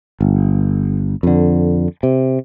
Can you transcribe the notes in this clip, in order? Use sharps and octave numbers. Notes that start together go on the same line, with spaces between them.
G1
F2 D3
C3